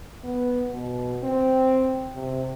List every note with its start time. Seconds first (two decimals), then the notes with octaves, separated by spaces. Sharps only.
0.24 B3
0.72 B2
1.23 C4
2.15 C3